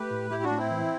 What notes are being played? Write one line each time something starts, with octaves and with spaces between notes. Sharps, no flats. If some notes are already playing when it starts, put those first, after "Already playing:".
Already playing: A3 G4 B4
A2
A2 E4 G4
D4 F#4
A2
C4 E4
E3